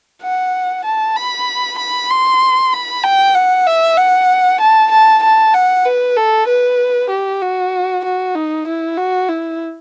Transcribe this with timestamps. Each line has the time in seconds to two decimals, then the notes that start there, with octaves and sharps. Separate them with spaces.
0.23 F#5
0.84 A5
1.16 B5
1.78 B5
2.10 C6
2.73 B5
3.04 G5
3.34 F#5
3.67 E5
3.97 F#5
4.61 A5
4.92 A5
5.23 A5
5.54 F#5
5.85 B4
6.17 A4
6.48 B4
7.10 G4
7.42 F#4
8.04 F#4
8.35 D#4
8.67 E4
8.97 F#4
9.29 E4